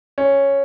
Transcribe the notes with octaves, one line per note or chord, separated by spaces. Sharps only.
C#4